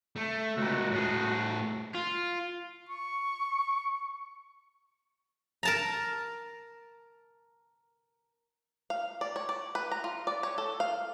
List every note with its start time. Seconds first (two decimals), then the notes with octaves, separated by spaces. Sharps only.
0.16 A3
0.57 C#2 A#2 F#4
0.91 A2 G#4
1.95 F4
2.89 C#6
5.63 A#4 A5 A#5
8.90 F5
9.21 D5
9.36 C#5
9.49 D5
9.75 B4
9.91 A#5
10.04 F4
10.27 D5
10.43 C#5
10.58 A4
10.80 F5